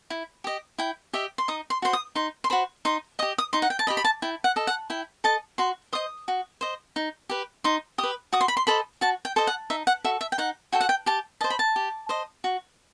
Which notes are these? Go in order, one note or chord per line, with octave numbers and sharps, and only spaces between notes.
E4
G4 D#5
E4 G5
G4 D#5 E5
C6
D#4 D#6
C6
F#4 C5 C6
D#6
D#4 C6
C6
F#4 C5 B5
D#4 C6
G4 D#5 D#6
D#6
D#4 C6
F#5
G5
A5
G4 D#5 B5
B5
A5
E4 G5
F#5
A4 D#5
F#5
E4 G5
A4 D#5 A5
F#4 C6
C5 D#5 D#6
F#4
C5 D#5
D#4
G4 B4
D#4 C6
G4 D#6
B4
F#4 D#6
C6
B5
C6
A4 C5 D#5 B5
F#4 A5
G5
A4 C5 D#5
F#5
D#4 E5
F#5
F#4 A4 E5
E5
G5
D#4 F#5
F#4 A4 G5
F#5
G5
G4 A5
C5 D#5 A5
B5
A5
G4
C5 D#5
F#4